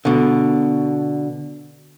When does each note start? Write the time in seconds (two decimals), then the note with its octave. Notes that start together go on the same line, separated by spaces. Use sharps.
0.05 B2 D3